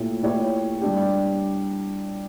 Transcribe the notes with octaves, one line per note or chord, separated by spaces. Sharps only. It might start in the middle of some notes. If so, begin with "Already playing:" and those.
Already playing: A#2 A3 E4 G4 C#5
A#2 A3 E4 G4 C#5
G3 D4 G4